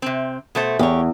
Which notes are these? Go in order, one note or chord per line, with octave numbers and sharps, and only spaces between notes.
C3 C4
B2 A3 C5
E2 G4 C#5